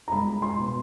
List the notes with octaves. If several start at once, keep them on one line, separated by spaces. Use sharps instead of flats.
A#5
G#3 B5
C6
B2